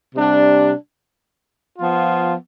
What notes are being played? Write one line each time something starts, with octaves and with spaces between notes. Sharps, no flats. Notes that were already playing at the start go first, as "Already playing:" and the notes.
C3 G3 D4
F3 B3 F4